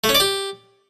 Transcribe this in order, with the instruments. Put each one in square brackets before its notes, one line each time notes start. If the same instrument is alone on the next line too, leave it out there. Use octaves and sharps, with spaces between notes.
[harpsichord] A3
C#4
D5
G4